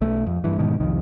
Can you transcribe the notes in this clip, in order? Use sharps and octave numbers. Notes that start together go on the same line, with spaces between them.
B1 A3
F2
G2 E3
G#2 B2 D#3
C2 F2 D#3